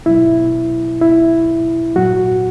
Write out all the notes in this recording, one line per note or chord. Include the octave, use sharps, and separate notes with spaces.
B2 F#3 E4
E4
A#2 F#3 F#4